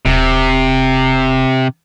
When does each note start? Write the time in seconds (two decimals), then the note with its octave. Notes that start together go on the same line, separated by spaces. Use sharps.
0.05 D#1 C3